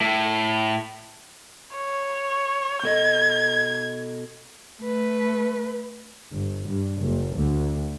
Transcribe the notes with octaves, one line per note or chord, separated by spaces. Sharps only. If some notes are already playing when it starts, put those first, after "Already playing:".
A2
C#5
B2 A4 D#5 G#6
A3 B4
G1
G2
F#1
D2